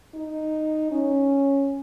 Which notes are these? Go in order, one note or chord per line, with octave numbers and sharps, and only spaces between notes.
D#4
C#4